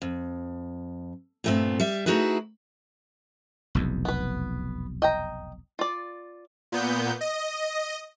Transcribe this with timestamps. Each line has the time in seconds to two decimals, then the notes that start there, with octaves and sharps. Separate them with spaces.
0.02 F2
1.44 G2 A#2 A3 B3 C4
1.80 G3 E5
2.06 A3 D#4 E4 F#4 G#4 B4
3.75 F1 B1 E2
4.05 B3 B4
5.02 D#5 G5 A#5
5.79 F4 D5
6.72 A#2 B3 G6
7.21 D#5